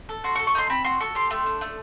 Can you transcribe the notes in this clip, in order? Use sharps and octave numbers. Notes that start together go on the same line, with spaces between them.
A4
F#4 C6
C#6
A4
C#6
D#4 C6
C4 B5
F#4 C6
A4 C#6
G4 C6
A3
D4
A3